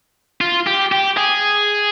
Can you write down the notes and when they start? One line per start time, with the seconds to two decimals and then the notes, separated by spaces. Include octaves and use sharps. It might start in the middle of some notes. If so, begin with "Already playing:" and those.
0.41 F4
0.67 G4
0.92 G4
1.17 G#4